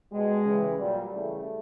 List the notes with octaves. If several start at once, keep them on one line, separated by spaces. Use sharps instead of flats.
B2 G3 G#3
C#3 E3 G3
A#2 F#3 G3
C#3 E3 G3 A3